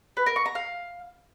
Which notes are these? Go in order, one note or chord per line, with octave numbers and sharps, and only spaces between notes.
B4
A#4
C#6
A#5
F5